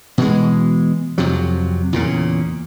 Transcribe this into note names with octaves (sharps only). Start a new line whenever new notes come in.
B2 E3 G#3
F2 C3 F#3
E2 A#2 C#3